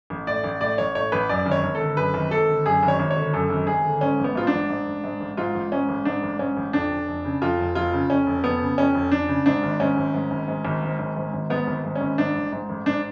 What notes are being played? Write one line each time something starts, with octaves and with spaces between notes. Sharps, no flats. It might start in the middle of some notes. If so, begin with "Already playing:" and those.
A1
A2 D5
A1
A2 D5
A1 C#5
A2 C#5
A1 B4
F#2 D5
G#1
C#5
G#1
A4
D3
F#2 B4
G#1
G#1 A4
D3
F#2 G#4
G#1
C#5
G#1
C#5
D3
F#2 A4
G#1
G#1 G#4
D3
G#2 C#4
A1
B3
G#2 F4
D4
A1
G#2
A1
G#2
A1
G#2 F4
A1
G#2 C#4
A1
G#2 D4
A1
G#2 C#4
A1
F2 D4
F1
F1
C#3
F2 F4
F1
F1 F4
C#3
F2 C#4
F1
F1 B3
C#3
F2 C#4
F1
F1 D4
C#3
G#2 D4
G#1
G#2 C#4
G#1
G#2
G#1
G#2
G#1
G#2
G#1
G#2
G#1
G#2 B3
G#1
G#2
C#4
G#1
G#2 D4
A1
G#2
A1
G#2 D4